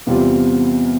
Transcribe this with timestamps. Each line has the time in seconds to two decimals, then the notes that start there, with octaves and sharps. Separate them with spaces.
0.07 E2 C3 G3 C4 F4